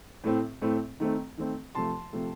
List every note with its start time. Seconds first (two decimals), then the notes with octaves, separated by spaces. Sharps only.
0.24 A2 A3 C4
0.62 A2 A3 C4
1.00 D#3 A3 C4
1.38 D#3 A3 C4
1.75 C3 F3 A3 A5 C6
2.13 C3 F3 A3